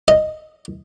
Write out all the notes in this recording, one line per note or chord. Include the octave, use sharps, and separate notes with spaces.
D#5